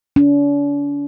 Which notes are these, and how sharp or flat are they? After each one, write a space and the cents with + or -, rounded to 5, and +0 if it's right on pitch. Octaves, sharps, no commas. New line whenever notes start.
D4 -45